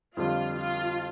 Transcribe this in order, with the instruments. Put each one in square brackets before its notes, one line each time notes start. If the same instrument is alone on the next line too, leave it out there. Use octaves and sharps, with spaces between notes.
[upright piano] F2 D3 G3 [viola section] F4
[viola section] F4